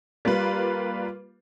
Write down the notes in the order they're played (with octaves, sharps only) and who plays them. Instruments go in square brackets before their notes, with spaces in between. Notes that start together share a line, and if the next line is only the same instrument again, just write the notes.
[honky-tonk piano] G3 A#3 F4 B4